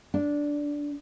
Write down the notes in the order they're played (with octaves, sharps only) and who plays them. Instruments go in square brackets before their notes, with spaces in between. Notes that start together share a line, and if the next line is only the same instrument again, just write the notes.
[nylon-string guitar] D4